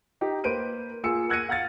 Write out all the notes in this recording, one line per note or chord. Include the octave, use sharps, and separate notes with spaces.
D#4 G4
A#3 B4 C5 D7 D#7
A#3 F4 G#4 E6 C#7
E6 F#6 G#6 A#6 C#7 D#7
F5 F#5 F6 G#6 A6